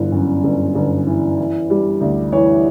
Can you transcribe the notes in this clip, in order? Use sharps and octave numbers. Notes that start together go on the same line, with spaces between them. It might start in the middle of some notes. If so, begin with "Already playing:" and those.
Already playing: G1 E3
F#2
G1
G1
E3
E3
G3
D2
E3 C#5